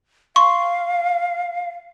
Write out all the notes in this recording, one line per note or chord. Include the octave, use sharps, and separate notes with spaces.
F5 C6 C#6